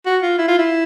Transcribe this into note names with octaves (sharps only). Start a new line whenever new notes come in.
F#4
F4
E4
F4
E4